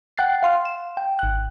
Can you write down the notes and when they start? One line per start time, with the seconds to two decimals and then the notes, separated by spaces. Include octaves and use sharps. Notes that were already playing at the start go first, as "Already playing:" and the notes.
0.18 F#5 G5 F#6 A6 C7
0.43 F5 C6 F6
0.65 E7
0.97 G5
1.19 G#1 F#6